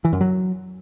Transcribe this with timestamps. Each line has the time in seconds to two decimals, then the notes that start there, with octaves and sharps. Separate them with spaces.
0.05 E3
0.13 F#2
0.21 F#3